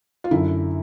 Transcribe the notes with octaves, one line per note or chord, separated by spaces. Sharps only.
F4
F#2 D3 E4